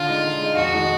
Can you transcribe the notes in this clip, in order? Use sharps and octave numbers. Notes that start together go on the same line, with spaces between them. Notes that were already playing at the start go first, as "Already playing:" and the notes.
Already playing: D3 F4
G#3 D#4
D3
G#3 D#4
F2 F#4
D#3 G#3 D#4